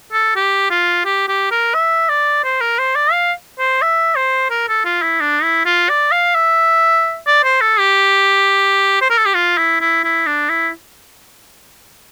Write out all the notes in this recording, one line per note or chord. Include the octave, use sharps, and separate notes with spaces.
A4
G4
F4
G4
G4
A#4
E5
D5
C5
A#4
C5
D5
F5
C5
E5
C5
A#4
A4
F4
E4
D4
E4
F4
D5
F5
E5
D5
C5
A4
G4
C5
A#4
A4
G4
F4
E4
E4
E4
D4
E4